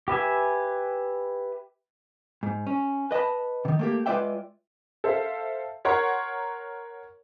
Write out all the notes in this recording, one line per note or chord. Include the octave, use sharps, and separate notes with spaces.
G4 B4 E5 G#5
G#2
C#4
B4 D#5 G#5 A5 B5
C3 D#3
A3 A#3 G4
G#3 F4 B4 D5 E5 G5
A4 C5 E5 F5
A#4 C#5 F#5 A#5 C6